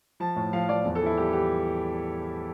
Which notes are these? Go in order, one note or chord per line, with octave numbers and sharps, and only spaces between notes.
F3 A5
A2
F3 F5
F3 D5
E2
A4
E3 E4
G3 G4
E3 G4